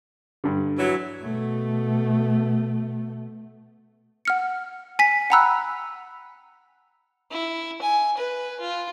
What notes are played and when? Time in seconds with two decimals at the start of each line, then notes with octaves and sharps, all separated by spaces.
0.44 G2 D3
0.79 E3 F#3
1.21 B2 A3
4.25 F#5 F6 C#7
4.99 G#5 B6
5.30 F#5 G5 A#5 B5 E6 F#6
7.31 E4
7.82 G#5
8.17 B4
8.60 F4